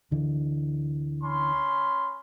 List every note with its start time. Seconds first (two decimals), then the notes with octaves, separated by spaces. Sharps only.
0.11 D2 D3 E3
1.23 C#4 B5 C6